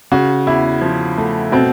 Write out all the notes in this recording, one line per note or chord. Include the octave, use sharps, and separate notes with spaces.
C#3 F#4
E2 E4
F3
A3
B2 C4